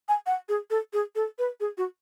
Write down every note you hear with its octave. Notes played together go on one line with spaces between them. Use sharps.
G#5
F#5
G#4
A4
G#4
A4
B4
G#4
F#4